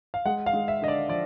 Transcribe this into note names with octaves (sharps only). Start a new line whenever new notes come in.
F5
G#3 F#5
F5
G#3
E5
D3 D#5
D5
F3 D5